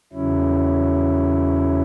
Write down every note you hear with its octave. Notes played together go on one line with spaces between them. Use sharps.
E2 C#3 F#3 C#4 E4